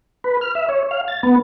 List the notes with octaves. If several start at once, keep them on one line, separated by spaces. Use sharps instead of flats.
B4
F6
E5
C#5
F5
A6
B3